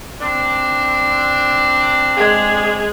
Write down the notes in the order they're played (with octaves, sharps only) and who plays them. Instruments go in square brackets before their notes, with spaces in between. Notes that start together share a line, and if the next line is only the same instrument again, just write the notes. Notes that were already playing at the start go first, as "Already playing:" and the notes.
[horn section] C4 D4
[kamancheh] G#3 G#4